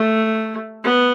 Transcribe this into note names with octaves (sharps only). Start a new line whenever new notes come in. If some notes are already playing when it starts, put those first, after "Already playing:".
Already playing: A3
B3